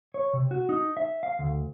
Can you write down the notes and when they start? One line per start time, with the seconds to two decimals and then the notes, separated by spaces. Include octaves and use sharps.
0.14 C#5
0.33 C3
0.51 F#4
0.69 D#4
0.97 E5
1.23 F5
1.39 D2